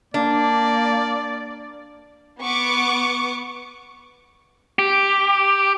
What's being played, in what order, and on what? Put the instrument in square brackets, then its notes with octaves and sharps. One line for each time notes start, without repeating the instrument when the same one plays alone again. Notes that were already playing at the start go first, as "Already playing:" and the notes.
[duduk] A#3 [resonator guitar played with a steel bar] D4 [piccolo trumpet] D5
[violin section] B3 C#6 D6
[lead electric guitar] G4